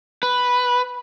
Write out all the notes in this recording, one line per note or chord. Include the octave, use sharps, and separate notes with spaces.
B4